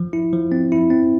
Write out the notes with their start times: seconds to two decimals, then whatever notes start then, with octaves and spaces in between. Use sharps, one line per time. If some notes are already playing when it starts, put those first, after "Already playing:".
Already playing: F3
0.13 E4
0.33 F3
0.52 C4
0.72 E4
0.90 C4